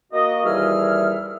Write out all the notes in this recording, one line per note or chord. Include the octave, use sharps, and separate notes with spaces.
A#3 F#4 D#5
D#2 E3 G3 G#4 E5 F6